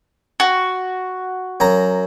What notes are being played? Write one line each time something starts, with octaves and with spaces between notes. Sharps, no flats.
F#4
F#2 A#5